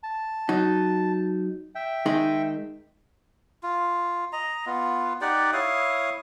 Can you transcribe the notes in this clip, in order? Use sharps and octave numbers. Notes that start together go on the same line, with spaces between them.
A5
F#3 D#4
E5 G5
D#3 G#3 D#4
F4
D#5 A#5
B3 F4
D#4 G4 D5 F#5
E4 C#5 F5 D#6